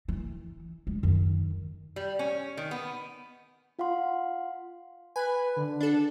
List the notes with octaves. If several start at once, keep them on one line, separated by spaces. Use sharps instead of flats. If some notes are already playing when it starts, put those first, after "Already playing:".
E3
G#3
F#2 D#3
G3
C#4
D#3
B3
F4 F5 F#5 C6
B4 G#5
D3
D4 A4